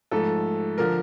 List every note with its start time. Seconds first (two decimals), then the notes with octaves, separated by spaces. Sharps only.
0.11 G#2 F3 A3 A4
0.78 D3 F3 A#4